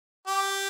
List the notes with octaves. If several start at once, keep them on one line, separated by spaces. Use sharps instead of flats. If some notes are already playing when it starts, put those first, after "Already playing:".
G4